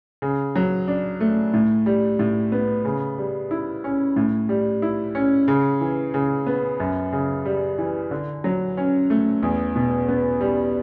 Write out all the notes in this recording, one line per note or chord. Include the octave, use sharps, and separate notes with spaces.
C#3
F#3
D4
A3
A2
G3
A2
B3
C#3
G3
E4
C#4
A2
G3
E4
C#4
C#3
E3
C#3
B3
F#2
C#3
G3
E3
D3
F#3
C#4
A3
E2
B2
B3
G3